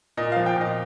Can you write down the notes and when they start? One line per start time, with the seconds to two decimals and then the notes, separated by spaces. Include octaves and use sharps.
0.17 A#2 D#5
0.32 F3 F5
0.46 G5
0.56 A#2 D#5